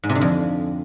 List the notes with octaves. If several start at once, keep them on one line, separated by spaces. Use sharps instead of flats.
G#2
C3
D3
F2